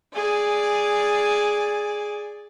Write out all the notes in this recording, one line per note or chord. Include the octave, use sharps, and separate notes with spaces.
G#4 D5 G#5